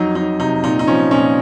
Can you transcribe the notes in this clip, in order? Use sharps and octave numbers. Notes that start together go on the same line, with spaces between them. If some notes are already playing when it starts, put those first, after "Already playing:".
Already playing: F2 F#3 D#4
F#3 D#4
C3 D#4
A#2 D#4
D#4
F3 C#4
A#2 C#4